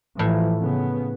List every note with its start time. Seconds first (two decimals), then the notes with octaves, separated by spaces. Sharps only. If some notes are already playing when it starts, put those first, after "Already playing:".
0.19 A2 E3 F3
0.57 C#3 B3